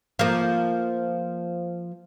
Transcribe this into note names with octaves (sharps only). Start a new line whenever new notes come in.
F3 A#3